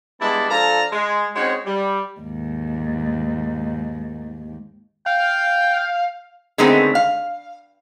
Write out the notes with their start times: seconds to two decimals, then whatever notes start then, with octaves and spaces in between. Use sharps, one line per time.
0.21 G3 G#3 B3 D4 E4 A5
0.50 F3 D4 A4 F5 A5 A#5
0.92 G#3
1.36 G#3 C4 C#4 D#4 F#4 C#5
1.66 G3
2.21 D#2 G#2
5.06 F5 G5
6.58 D3 D#3 G#3 A3 B3 C4
6.95 F5